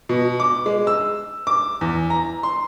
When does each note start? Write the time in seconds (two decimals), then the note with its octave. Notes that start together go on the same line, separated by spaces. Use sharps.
0.09 B2
0.40 D6
0.66 G#3
0.87 E6
1.47 D6
1.81 E2
2.10 A#5
2.43 C6